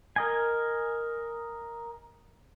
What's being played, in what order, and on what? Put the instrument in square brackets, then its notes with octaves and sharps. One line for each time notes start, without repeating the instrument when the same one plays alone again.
[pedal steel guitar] A#4 D#5 G#5